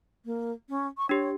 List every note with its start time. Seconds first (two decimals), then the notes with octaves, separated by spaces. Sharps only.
0.25 A#3
0.69 C#4
0.97 C#6
1.09 D4 G4 C#5